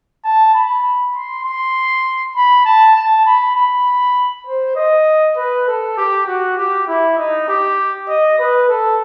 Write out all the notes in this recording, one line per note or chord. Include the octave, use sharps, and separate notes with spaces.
A5
B5
C6
C6
B5
A5
A5
B5
B5
C5
D#5
B4
A4
G4
F#4
G4
E4
D#4
G4
D#5
B4
A4